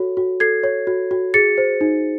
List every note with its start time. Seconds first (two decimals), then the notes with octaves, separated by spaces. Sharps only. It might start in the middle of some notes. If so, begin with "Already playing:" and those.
Already playing: F#4 A4 C#5
0.17 F#4
0.40 A4 G#6 C7
0.64 C#5
0.87 F#4
1.11 F#4
1.34 G#4 A6 C#7
1.58 C5
1.81 D#4